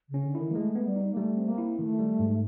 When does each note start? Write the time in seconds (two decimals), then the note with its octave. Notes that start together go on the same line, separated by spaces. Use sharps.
0.09 C#3
0.14 C#4
0.24 D3
0.35 D#3 E4
0.51 A#3
0.55 G#3 A3
0.75 B3
0.86 G3
0.96 D#4
1.12 A#3
1.17 G3 A3
1.37 C4
1.48 A#3
1.58 E4
1.79 D#3 A3
1.99 G3
2.19 G#2